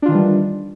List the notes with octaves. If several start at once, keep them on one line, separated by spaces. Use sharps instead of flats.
D#3 E3 G3 D4 F4